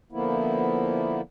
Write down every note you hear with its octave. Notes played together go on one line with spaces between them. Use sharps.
D3 F3 A#3 B3 E4